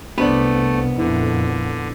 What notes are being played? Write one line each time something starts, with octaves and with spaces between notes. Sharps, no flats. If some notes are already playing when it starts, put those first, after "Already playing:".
C2 A3 B3 D4 B4 C5 D5
F2 A#2 D3 E4 A4